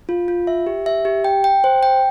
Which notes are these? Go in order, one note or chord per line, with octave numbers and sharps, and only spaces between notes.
F4
F4
E5
G4
E5
G4
G5
G5
C5
G5